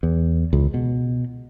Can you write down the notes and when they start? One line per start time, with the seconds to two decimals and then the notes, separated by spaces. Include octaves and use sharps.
0.03 E2
0.53 C#2
0.74 B2